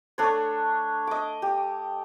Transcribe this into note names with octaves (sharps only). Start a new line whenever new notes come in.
A3 D4 C#5
D#5 D6
G4